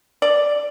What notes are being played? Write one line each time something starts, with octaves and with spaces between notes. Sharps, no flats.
D5